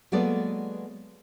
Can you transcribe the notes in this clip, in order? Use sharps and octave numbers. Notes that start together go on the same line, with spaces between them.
F#3 G#3 A#3 B3 A4 D5